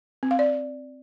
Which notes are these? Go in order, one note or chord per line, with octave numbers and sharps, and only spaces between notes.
C4
F5
D5